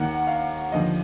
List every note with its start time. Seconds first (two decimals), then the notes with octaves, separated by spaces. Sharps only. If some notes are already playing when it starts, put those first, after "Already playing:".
Already playing: D#2 D#3 A#3 F#5
0.27 F5
0.72 D#2 D3 F3 D#5